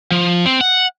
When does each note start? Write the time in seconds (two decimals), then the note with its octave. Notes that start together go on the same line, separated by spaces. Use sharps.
0.12 F3
0.46 C4
0.61 F#5